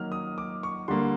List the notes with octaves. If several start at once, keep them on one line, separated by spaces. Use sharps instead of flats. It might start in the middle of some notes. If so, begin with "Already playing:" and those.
Already playing: D#3 F#3 A#3 F6
D#6
D6
C#6
D3 G3 A#3 C6